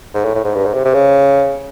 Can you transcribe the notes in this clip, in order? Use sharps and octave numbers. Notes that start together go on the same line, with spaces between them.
G#2
A2
A2
G#2
G2
G#2
C3
C3
C#3